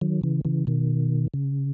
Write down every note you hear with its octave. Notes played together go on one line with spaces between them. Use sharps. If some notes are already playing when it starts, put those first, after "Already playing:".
D#3 F#3
C#3 E3
C#3 E3
B2 D#3
C#3